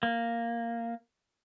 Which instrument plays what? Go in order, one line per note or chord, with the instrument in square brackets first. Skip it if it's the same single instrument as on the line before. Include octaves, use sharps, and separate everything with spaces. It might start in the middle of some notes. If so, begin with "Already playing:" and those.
[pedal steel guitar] A#3